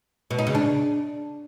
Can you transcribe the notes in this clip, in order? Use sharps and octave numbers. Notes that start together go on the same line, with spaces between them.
B2
D#4
C#3
D4